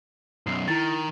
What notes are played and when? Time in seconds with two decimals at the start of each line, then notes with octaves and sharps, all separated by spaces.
0.47 B1 F#2 C7
0.68 D#3 E4 A6